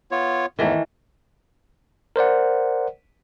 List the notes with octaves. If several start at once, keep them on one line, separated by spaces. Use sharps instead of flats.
B3 F4 C#5
E2 G#2 D#3 E3 A3
A#4 C5 D5 F#5